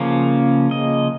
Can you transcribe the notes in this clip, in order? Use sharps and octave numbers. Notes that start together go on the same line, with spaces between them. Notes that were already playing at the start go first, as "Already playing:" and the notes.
Already playing: C#3 F3 A#3 C#4
D#5